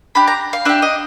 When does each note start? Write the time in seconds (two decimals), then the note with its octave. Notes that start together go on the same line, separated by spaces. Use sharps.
0.15 D4 G4 B5
0.27 A#5
0.53 F5
0.65 D4 G4 E5
0.82 D#5